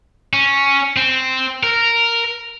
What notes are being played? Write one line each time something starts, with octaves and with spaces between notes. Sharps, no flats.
C#4
C4
A#4